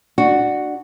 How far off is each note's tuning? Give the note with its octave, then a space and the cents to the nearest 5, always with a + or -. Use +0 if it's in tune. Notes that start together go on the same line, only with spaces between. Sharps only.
D4 +15 F#4 +0